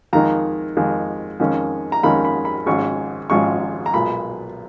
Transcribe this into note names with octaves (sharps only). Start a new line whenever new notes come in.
F2 D#3 G#3 A#5
F2 D#3 G#3
F2 D#3 G#3 C#4
A#5
F2 D#3 G#3 C#4 B5
B5
B5
G#1 G#2 F3 G#3 C#4 C#6
G#1 G#2 F3 G#3 C#4 C#6
A#5
B1 A#2 G#3 B5